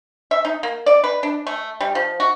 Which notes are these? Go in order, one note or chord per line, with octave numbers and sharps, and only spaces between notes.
E5
D#4
A#3
D5
B4
D4
A3
G3
F3
F#4